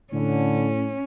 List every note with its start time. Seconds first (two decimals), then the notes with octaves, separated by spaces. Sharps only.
0.13 A2 D3 C#4